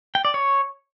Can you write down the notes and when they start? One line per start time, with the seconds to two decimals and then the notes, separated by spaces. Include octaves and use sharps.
0.15 G5
0.25 D5
0.34 C#5